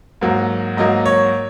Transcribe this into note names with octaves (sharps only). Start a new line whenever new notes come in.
G#2 F#3 A#3
G#2 F#3 A#3 D#5
C#5